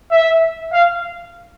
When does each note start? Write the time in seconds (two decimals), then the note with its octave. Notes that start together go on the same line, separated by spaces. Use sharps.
0.11 E5
0.72 F5